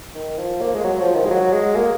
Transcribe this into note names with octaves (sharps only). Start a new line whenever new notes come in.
D#3
F3
A#3
G#3
F#3
F3
D#3
G#3
F#3
G#3
A#3